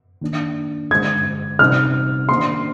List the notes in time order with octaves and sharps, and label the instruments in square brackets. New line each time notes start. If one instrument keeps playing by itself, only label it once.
[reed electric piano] D#3 A#3 D4
[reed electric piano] G2 D3 G#3 [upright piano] G#6
[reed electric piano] C3 G3 C4 D#4 [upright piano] F6
[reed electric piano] D#3 A#3 D4 [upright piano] C6